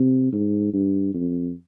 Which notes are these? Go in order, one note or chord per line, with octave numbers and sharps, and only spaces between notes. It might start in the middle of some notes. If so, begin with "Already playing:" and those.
Already playing: C3
G#2
G2
F2